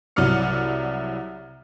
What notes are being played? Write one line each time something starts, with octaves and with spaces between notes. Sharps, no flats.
C2 F#3 E4 D5 F6 C#7